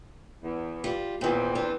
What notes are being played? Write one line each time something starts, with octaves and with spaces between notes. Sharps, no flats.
E2
G3 F4
E2 A#2 D#3 C4
B3 D4